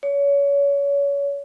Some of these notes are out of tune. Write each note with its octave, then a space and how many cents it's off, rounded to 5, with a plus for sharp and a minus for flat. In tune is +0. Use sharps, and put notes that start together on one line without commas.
C#5 +30